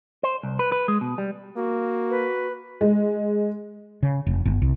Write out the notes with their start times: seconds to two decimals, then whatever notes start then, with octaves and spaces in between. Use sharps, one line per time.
0.23 C5
0.43 C2
0.59 B4
0.72 B4
0.88 G#3
1.01 B2
1.18 G3
1.56 A#3 F#4
2.10 B4
2.81 G#3
4.03 C#3
4.27 F1
4.45 G1
4.62 C2